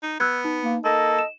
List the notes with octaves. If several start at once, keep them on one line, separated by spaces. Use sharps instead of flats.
D#4
B3 E6 F#6 G#6
D#4
A#3
A#3 A4 D#5
E7